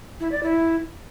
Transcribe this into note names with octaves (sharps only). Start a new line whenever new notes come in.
E4
D5
E4